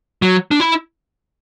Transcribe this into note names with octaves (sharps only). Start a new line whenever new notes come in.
F#3
D4
E4